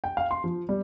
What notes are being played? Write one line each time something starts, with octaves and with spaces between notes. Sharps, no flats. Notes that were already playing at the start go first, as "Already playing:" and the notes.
G5
F5
C6
F3
G3